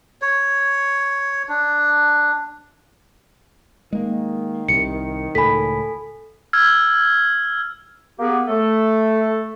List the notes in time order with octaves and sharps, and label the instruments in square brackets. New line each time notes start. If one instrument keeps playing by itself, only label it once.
[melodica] C#5
D4
[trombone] D#3 [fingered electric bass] G#3 A#3
[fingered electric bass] C2 C3 [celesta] C#7
[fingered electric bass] C#2 A2 [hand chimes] A4 G#5 [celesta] B5 B6
[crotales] E6 F6 G#6
[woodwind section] A#3 B3 G4 G#4
A3 A4